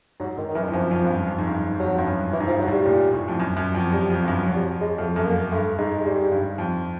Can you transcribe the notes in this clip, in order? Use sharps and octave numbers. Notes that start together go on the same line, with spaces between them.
G#2 F#3
G#2 D#3
D#3
F#2 E3
F2
F#2 F3
F2
G2
F#2
F2
G#2
G2
F#2
F2 F#3
G2
F#2
E3
G#2
F3
G2
F#3
A2
G3
A#2
A2
F2
F#2
F#2
F2
F#2 G3
F2
G2
F#2
F2 F#3
G3
F#3
G#3
F2 A3
F#2 A3
A#3
G2 A3
G#2 G#3
G#3
G#2 G3
G2
F2